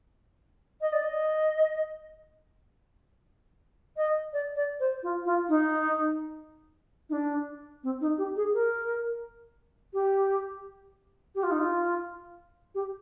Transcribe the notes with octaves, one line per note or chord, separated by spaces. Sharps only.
D#5
D5
D#5
D#5
D5
D5
C5
F4
F4
D#4
D#4
D4
C4
D#4
G4
G#4
A#4
G4
G4
F4
D#4
F4
G4